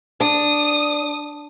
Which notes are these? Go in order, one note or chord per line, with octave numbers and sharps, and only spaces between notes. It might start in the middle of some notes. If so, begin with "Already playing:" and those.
D4 D#6